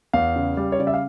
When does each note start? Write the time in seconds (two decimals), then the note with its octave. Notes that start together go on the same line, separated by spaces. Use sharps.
0.13 E2 F5
0.36 C#3
0.57 G3
0.72 C#5
0.79 C#3 D5
0.87 E5
0.94 F5